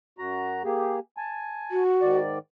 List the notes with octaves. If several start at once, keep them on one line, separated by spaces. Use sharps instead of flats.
F#2 F#4 A#5
A#3 G4 G#4
G#5 A5
F#4
G#2 D#3 D5